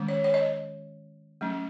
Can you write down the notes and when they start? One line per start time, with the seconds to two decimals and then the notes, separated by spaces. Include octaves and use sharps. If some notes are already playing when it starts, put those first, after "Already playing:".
Already playing: D#3 G#3 C#4
0.08 C#5
0.24 C#5
0.34 D#5
1.41 F#3 A3 C#4